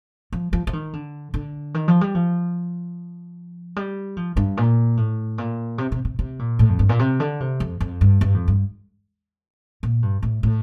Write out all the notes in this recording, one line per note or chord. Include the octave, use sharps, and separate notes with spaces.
F3
F3
F3
D#3
D3
D3
D#3
F3
G3
F3
G3
F3
G2
A#2
A2
A#2
C3
C3
C3
C3
A#2
A2
F2
G2
A#2
C3
D3
C3
F2
F2
G2
G2
F2
G2
A#2
G2
A2
A2